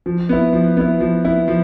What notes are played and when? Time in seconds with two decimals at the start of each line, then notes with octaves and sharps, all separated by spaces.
0.06 F3
0.29 B3 E4
0.53 F3
0.77 B3 E4
1.00 F3
1.24 B3 E4
1.48 F3